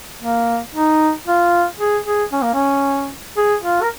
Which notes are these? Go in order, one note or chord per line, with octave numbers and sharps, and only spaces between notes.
A#3
D#4
F4
G#4
G#4
C#4
A#3
C#4
G#4
F4
A#4